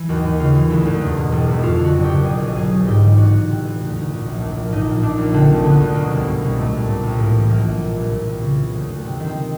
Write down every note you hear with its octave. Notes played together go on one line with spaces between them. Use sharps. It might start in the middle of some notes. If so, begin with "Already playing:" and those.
Already playing: E3
D#2 F#4
D#2
C#3 F4
E3
D2 E4
D2
E2
B2
E1
E1 E4
F2 F4
D3
F#4
F#1
G4
F#1
B2 G#4
B1
B2 G#4
B1
G#2 G4
E3
A1 F#4
A1
C3
E3
D2
D2
A#2
A#1
A#2
A#1
A#2 D#4
A#1
A#2 D4
A#1
D3 C4
D2
D3 B3
D2
B2 A#3
C2
B2
C2
A#2 A3
C2
A#2
C2
A2 A#3
E3
A#1 A#3
A#1
A#2
C2
A#2
C2
C#3
E3
D2
D2
C3
D#3
C4